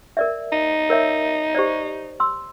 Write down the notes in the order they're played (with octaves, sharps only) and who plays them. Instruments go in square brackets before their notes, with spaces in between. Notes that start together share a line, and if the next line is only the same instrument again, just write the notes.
[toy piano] A#4 D5 E5
[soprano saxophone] D#4
[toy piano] A#4 C#5 E5
G4 C5 D5
C6 E6